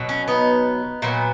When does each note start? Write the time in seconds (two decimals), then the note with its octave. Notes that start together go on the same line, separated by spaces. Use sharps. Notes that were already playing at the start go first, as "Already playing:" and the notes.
Already playing: B2 F#3
0.09 C#4
0.28 B3 D#4
1.02 A#2 F#3 B3